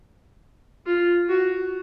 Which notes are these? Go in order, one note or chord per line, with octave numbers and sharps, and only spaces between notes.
F4
F#4